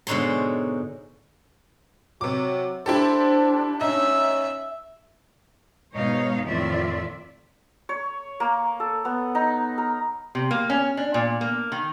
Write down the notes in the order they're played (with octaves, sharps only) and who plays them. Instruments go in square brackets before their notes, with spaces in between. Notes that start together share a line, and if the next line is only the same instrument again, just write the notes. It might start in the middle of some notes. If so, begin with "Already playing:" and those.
[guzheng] G#2 B2 D3 D#4 C#5 C6
[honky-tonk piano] C3 D6 [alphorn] F#3
[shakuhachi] D4 [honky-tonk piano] E4 G4 A4 [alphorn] C5
[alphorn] C#4 [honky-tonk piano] D#4 [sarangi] E5
[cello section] G#2 B2 D#4 C#5 F5
F2 A2 D#3 F4 D5 E5
[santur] C#5
A#3
A4
B3
D#4
A#4
[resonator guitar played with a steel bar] C3
A#3
C#4
D4
A#2
A#3
D#3